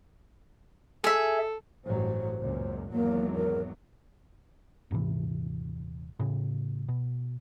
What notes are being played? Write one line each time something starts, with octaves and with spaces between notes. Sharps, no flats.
G#4 A4 E5
A1 G2 F#3 C5
C#2 F#2 A#2
G#1 E2 F#3 A#3
A#4
D#1 G#2 C3 E3
A2 C#3
B2